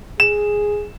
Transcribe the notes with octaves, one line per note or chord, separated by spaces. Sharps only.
G#4 E7